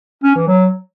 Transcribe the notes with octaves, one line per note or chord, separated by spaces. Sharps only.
C#4
E3
F#3